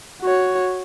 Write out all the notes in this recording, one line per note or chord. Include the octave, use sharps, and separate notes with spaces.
F#4 C#5